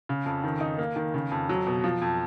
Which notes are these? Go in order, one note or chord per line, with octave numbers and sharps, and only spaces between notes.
C#3
F2
D#3
D#4
A#3
D#3
C#3
F2
F#3
B2
F3
F2